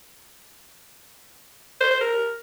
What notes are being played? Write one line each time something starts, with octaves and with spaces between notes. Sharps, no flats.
C5
C5
A#4